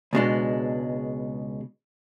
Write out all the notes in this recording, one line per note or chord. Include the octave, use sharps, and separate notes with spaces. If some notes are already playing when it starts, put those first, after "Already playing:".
C#2 B2 G#3 D4